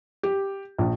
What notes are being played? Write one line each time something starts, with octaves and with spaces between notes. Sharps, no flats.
G4
A#1